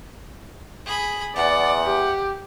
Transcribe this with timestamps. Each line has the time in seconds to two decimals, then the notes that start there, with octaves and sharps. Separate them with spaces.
0.85 G#4 B5
1.36 E2 D5 F#5
1.83 G4